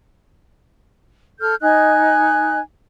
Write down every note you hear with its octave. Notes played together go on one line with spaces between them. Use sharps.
A4 F6 G6
D#4 D#5 G#5 F#6